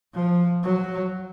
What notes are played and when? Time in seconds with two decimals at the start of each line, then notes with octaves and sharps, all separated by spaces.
0.14 F3
0.63 F#3